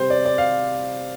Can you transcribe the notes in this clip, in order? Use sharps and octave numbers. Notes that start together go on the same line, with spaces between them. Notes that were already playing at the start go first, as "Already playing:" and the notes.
Already playing: C3 G3 C5
D5
D5
F5